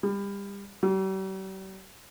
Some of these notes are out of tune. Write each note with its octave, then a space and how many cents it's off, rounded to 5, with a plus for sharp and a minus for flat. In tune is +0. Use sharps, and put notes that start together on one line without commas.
G3 +30
G3 -45